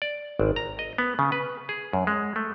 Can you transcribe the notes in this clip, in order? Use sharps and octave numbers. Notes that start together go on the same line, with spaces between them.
D5
G#1
A#5
D#5
B3
C#3
B4
G#4
F#2
G#3
A3